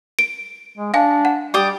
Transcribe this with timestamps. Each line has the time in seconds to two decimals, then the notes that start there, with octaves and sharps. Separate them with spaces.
0.19 D7
0.78 G#3
0.94 D4 F5 G#5
1.25 F#5
1.54 G3 G4 D5 D#6